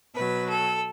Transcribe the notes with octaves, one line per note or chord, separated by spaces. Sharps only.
B2 F#3 B4
A4